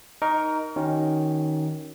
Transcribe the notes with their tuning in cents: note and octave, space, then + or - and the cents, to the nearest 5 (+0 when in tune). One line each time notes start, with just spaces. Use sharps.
D#4 +0 A#4 +10 C#6 +40
D#3 +0 C#4 +0 F#4 +40